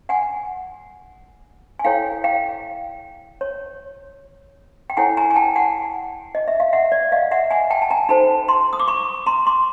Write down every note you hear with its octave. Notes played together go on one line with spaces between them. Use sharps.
F#5 G#5
G#5
E4 A4 C#5 F5 G5
F5 G5
C#5
G5
E4 A4 C#5 F#5 G#5
G#5 A#5
G#5
G5 A5
F#5 G#5
D#5
E5
F5
E5 F#5
D5
D#5 F5
E5 F#5
F#5 G#5
G5 A5
A5
G#5 A#5
D#4 F#4 A4 C5 A5 B5
A#5 C6
D#6
D6
B5 C#6
A#5 C6
C6 D6